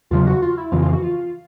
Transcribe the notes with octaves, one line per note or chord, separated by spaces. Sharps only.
E2 C#3 F#3 F4
F#4
F4
E4
F2 C#3 E3 F4
F4
F#4
F4